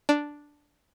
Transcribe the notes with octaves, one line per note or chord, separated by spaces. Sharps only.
D4